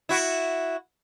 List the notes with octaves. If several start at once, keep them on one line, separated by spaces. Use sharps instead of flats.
E4 F#4